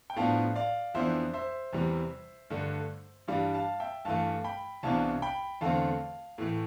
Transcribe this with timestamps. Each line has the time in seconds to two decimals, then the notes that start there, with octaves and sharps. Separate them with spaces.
0.10 G5
0.16 A2 F3 B3 D4 F5 A5
0.56 D5 F5
0.94 F2 E3 B3 D4 C5 E5
1.34 C5 E5
1.73 E2 C3 E3 G3
2.50 G2 D3 A3 D4
3.28 G2 E3 G3 D4 D5 F5
3.54 F5 A5
3.80 E5 G5
4.05 G2 E3 A3 F5 A5
4.44 G5 B5
4.83 C2 C3 E3 B3 D4 F5 A5
5.22 G5 B5
5.61 E2 D3 A3 C4 F5 A5
6.38 A2 E3 A3